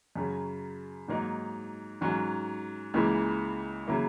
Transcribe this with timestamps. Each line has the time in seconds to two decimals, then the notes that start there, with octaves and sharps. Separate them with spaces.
0.16 F#2 C#3 F#3
1.08 G#2 F#3 A#3 D#4
2.01 G#2 F#3 C#4
2.94 C#2 C#3 E3 A#3
3.86 C#3 F#3 A#3 E4